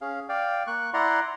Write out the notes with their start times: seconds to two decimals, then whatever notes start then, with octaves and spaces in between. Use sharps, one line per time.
0.01 C#4 G#4 F5
0.29 D5 F5 G5
0.67 A#3 C#6 F#6
0.94 E4 D5 F#5 A#5 C6